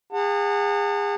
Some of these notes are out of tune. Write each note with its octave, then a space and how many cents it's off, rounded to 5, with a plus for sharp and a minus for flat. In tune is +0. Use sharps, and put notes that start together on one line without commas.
G#4 -30 F#5 -10 A5 +40